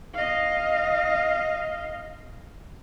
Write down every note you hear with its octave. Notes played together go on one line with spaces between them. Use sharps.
D#5 F5